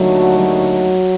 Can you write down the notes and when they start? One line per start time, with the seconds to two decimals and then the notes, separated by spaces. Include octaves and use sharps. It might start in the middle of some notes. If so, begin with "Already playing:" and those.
Already playing: D#2 D3 F#3 A3 D#4 F#4
0.40 F#3